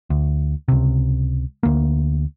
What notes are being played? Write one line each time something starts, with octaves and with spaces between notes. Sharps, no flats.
D2
C#2 C3
D2 A#3